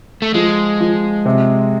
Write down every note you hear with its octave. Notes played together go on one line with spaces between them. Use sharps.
A3
F3 G#3
F3
C3